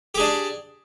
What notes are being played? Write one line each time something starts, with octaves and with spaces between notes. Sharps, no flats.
D4 G4 G#4